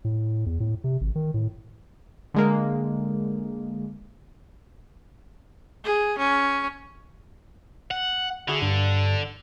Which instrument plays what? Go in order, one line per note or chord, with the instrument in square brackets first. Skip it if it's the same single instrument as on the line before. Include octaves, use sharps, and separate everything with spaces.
[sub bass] A2
E2
A2
C3
G#1
D#3
A2
[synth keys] D3 G#3 A#3
[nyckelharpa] G#4
C#4
[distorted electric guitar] F#5
[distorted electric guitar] D3 [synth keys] E4 F#4 G#4
[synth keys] G2